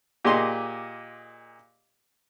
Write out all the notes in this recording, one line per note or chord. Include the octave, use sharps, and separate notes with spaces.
A#2 G4 G#4 D#5 C6